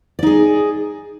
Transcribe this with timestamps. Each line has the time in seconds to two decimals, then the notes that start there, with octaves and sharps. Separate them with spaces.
0.19 D5
0.23 D#4
0.27 G#4